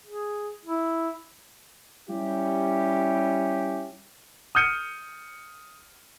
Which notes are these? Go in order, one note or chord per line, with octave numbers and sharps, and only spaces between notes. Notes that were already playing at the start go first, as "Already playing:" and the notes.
G#4
E4
G3 C#4 E4 G4
D#6 F6 G6 C#7 D#7